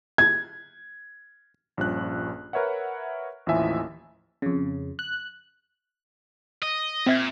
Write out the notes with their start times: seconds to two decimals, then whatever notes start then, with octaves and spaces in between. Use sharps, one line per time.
0.18 G#6
1.77 A#1 G2 F3 C#4 F#6
2.53 A#4 B4 C#5 E5 F#5
3.46 A1 D#2 F3 E4 E5 G#5
4.42 F2 C#3
4.99 F#6
6.62 D#5
7.06 A#2 C4 E5 G#6